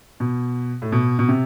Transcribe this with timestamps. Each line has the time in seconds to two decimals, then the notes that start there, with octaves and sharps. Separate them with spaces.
0.20 B2
0.82 A2
0.92 B2
1.19 B2
1.29 C3